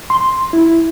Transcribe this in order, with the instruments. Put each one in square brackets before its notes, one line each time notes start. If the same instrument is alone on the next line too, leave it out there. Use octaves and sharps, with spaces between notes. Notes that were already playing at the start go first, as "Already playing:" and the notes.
[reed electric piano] C6
E4